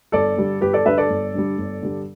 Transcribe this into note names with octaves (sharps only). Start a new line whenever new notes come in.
G1 A4 D5
G2 D3 G3
G1 G4 B4
A4 D5
G2 D3 G3 B4 E5
A4 D5
G1
G2 D3 G3
G1
G2 D3 G3